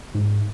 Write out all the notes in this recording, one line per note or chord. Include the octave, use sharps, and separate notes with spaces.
G#2